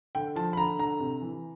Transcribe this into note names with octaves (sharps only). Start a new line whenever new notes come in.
D3 G5
F3 A5
B5
D3 A#5
D3 A#5
C3
E3